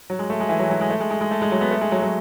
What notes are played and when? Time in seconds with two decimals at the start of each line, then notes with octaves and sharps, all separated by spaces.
0.10 F#3
0.19 G#3
0.30 A3
0.40 G#3
0.49 E3
0.59 F#3
0.70 F#3
0.81 G#3
0.90 A3
1.00 G#3
1.10 G#3
1.21 G#3
1.31 A3
1.42 G#3
1.52 F#3
1.61 B3
1.71 A3
1.81 G#3
1.92 F#3
2.02 F#3